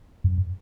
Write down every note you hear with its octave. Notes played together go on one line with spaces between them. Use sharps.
F#2